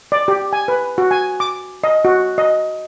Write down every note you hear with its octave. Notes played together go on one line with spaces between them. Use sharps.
D5
G4
G#5
B4
F#4
G#5
D6
D#5
F#4
D#5